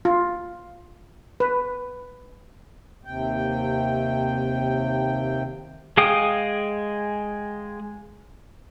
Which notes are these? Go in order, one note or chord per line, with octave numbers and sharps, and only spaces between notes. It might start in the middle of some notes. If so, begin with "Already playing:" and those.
F4
B4
D#2 C3 G5
G#3 G#4 F5 G5 D#6